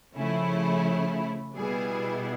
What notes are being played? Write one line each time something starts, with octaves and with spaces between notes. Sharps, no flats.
C#3 F3 A3 C#4 E4
B2 G3 B3 E4 G#4